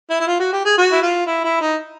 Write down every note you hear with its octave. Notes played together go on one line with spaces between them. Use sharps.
E4
E4
F4
F#4
G4
G#4
F#4
E4
F4
E4
E4
D#4